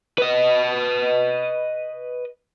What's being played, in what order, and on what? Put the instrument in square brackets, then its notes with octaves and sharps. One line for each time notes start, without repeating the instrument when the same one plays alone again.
[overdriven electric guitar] B4 D#5